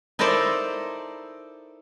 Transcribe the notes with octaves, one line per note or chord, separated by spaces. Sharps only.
D#4 E4 A4 A#4 C5 D5